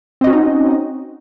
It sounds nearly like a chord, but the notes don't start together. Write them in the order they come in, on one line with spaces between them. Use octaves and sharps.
C4 D#5 F#4 C#4 D#4